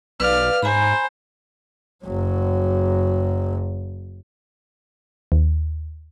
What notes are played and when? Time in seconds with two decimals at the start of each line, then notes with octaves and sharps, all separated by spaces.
0.20 B1 B4 D5 F5 F6
0.63 G#2 C5 G#5 A#5 B5
2.05 F#1 F#3
5.32 D#2